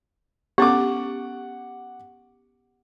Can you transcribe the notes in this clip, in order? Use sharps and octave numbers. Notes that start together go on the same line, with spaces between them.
B3 C#4 G4 A4 F#5 D6